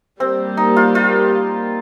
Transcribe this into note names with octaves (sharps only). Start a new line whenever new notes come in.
G3 A#3 C4 G4
D#4
F4
F4